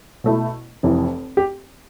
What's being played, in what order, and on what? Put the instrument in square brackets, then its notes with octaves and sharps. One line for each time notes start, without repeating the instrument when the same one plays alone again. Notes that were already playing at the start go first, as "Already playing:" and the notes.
[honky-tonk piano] B2 A3 E4
F1 F2 E3
[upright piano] G4